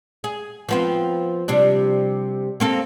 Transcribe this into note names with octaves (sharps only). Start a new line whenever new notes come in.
G#4
F3 B3 C4
C3 G3 D4
A#3 C4 A4